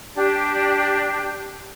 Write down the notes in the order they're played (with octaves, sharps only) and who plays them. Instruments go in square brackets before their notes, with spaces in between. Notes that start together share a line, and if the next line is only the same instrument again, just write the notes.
[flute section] D4 G4